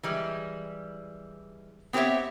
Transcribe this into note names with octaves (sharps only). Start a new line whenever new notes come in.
E3 G3 G#3
B3 C4 G4 C5 C#5 E5